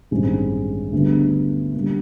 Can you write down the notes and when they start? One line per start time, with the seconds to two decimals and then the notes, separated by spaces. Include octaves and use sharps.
0.11 A1 G2 D#3 G#3 C4
0.92 D2 D3 G3 B3
1.74 D3 G3 A#3